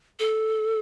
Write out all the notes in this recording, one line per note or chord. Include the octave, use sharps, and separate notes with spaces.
A4